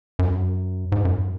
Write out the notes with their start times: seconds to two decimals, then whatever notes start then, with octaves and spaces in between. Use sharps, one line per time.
0.19 F#2
0.92 G#2
1.05 F#2